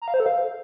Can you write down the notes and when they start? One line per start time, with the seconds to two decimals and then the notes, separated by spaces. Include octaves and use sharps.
0.02 A#5
0.08 F5
0.14 C5
0.20 A4
0.26 F5